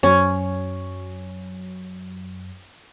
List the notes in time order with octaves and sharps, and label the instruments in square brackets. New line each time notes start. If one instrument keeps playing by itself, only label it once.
[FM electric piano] F#2 F#3 [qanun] C#4